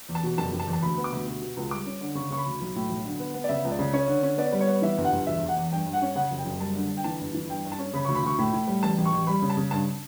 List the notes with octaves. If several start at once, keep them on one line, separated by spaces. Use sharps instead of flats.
E2
A5
B2
F#1 A5
F#1
A5
E2
A5
D2 B5
B3
D6
D2
B2
B2
C#2
G3 D6
C#4
D3
C#3 C#6
C#3 C#6
B5
D2
B1
A2
B1
D3
B3
B3
D5
C#3 E5
C#2
D5
C#3
C#4 C#5
D3
C#4
B3 D5
G3
C#5
B3
E3 E5
G1
F#5
G1
E1 E5
E2
F#5
E2
G2 G5
G2
F#5
C#4
C#3 F#5
F#1
G5
F#1
G3 A5
D3
D3
G5
E3 A5
G1
E3
G2 G5
G2
A5
C#4
C#3 B5
C#6
D2
B5
D2 C#6
A2 B5
A2
G3
A1 A5
A1
C#6
A1
G3 B5
C#3
A5
C#3
G2 A5